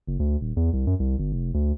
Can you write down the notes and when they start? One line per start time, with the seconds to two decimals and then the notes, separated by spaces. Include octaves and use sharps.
0.07 F#1
0.19 D2
0.41 D#1
0.57 E2
0.73 C2
0.87 F#2
1.00 C2
1.19 G1
1.33 F1
1.54 D2